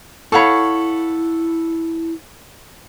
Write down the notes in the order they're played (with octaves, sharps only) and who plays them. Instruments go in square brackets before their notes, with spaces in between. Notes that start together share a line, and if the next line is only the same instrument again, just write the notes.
[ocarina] E4 [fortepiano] A4 F#5 B5 [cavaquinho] C#5 F5 C#6